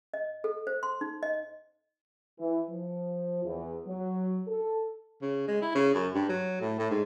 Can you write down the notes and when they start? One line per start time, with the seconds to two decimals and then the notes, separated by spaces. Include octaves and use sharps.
0.14 D#5
0.44 A4
0.67 C5
0.83 C6
1.01 D#4
1.23 D#5
2.38 E3
2.70 F3
3.44 E2
3.87 F#3
4.47 A4
5.22 C#3
5.47 G#3
5.62 E4
5.75 C#3
5.94 F#2
6.14 G2
6.29 F#3
6.61 A2
6.79 A2
6.90 G#2